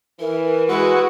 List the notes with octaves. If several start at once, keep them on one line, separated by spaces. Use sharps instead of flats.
E3 A#4
G#3 E4 F#4 B4